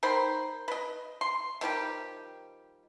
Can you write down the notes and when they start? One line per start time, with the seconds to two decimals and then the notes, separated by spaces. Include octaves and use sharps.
0.03 D#3 C5 B5
0.68 B4 D#5
1.21 C6
1.61 D#3 F3 G3 G4